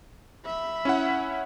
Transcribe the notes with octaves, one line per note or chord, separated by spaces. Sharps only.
E5 B5
C#4 E4 F#5